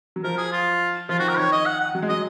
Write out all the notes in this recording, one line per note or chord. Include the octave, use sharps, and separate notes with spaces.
F#3
F3 A#4
G#4
F4
F3 F4
D#3 F#4
A#4
D#3 C#5
D#5
F#5
F#5
F#3
G#3
F#3 D#5